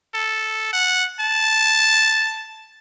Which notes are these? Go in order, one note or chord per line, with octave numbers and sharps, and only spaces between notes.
A4
F#5
A5